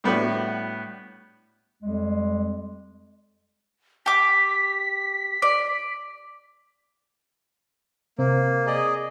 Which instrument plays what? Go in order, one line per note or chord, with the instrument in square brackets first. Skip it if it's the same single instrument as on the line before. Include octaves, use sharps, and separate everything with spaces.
[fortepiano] A2 G3 B3 D4 F#4 B4
[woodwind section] F2 G3 G#3
[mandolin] G4 D6 [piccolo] B6
[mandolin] D5
[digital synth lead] C3 [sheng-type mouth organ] A#3
[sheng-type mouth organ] G#4 D5 D#5